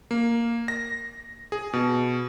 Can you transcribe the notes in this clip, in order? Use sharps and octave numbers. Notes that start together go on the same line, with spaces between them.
A#3
A#6
G#4
B2